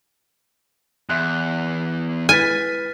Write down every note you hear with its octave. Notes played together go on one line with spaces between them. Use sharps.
E2 E5 C6 F#6
G#3 E4 B4 G#5 F6 A6 B6